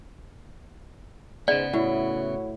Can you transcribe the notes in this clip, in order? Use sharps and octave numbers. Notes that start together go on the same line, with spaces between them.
G#2 C#3 B3 D5
A2 E4 F#4 C#5